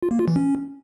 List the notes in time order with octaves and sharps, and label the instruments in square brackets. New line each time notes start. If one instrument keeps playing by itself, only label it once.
[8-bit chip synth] F4
A#3
F4
E3
C#4